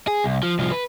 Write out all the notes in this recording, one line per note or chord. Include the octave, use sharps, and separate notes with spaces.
G#4
C2
F3
C2 F3
B4